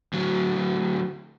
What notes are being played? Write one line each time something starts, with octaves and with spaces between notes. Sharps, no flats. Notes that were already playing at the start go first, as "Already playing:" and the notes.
D2 F#3